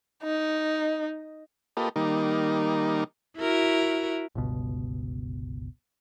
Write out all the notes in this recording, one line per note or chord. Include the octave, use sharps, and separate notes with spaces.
D#4
A#3 F4 G4 A4 B4 D#5
D#3 G3 A#3 D#4
E4 F#4 A#4
G1 C#2 B2